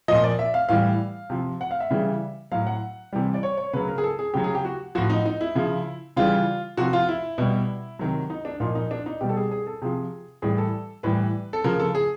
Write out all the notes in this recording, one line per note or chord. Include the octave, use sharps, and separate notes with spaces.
A#2 F3 D#5
D5
E5
F5
A2 E3 G3 F5
C3 F3
F#5
F5
E5
C#3 E3 G3
A2 F#3 F5
F#5
C3 E3 G3
D5
C#5
C#5
C#3 F#3 B4
A#4
G#4
A4
G#4
C#3 F#3 G4
G#4
G4
F#4
A2 F3 F#4
D#4
D#4
E4
C#3 F3
C#3 E3 G3 F4
C3 F3 F#4
F4
E4
B2 G3
C3 D#3 F#3
D#4
D4
A#2 F3 D#4
D#4
D4
D#4
B2 G3 G4
A4
G#4
G#4
A4
C3 F3 G#4
A2 E3 G3 G#4
A4
A2 E3 G3 B4
A4
C#3 F3 A#4
A4
G#4